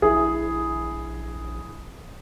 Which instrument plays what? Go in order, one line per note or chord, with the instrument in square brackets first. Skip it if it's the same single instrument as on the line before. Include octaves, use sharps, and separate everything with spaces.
[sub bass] A#1 [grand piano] E4 G#4